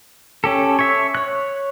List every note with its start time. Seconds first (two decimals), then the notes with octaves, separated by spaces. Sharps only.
0.44 C#4 G4 A4
0.79 C#5 E5
1.15 C#5 F#6